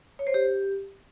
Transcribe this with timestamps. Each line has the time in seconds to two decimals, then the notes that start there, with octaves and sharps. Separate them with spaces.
0.19 C#5
0.27 C5
0.34 G4